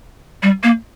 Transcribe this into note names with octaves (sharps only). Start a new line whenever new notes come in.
G3
A#3